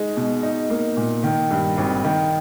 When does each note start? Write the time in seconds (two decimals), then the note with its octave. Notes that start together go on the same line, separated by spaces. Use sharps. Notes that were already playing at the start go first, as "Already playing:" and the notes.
Already playing: G#3 D#4
0.17 B2
0.43 D#4
0.70 A#3
0.97 A#2
1.23 D#3
1.51 G2
1.78 G#1
2.04 D#3